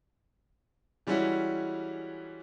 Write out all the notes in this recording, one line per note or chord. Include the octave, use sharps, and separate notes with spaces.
E3 G3 G#3 C#4 E4 F#4